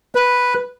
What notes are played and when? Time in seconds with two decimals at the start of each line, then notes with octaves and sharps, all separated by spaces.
0.15 B4